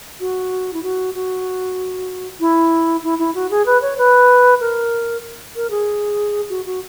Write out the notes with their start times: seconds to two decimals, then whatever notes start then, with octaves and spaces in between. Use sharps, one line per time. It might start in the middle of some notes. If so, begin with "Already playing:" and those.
0.20 F#4
0.73 E4
0.83 F#4
1.14 F#4
2.40 E4
3.03 E4
3.19 E4
3.35 F#4
3.51 G#4
3.66 B4
3.82 C#5
3.98 B4
4.60 A#4
5.55 A#4
5.70 G#4
6.49 F#4
6.65 F#4